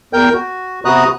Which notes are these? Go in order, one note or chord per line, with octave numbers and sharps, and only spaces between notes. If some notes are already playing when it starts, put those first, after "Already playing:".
E2 A#4 G5 G6
F#4
C3 B3 F#4 A#5 D#6 F#6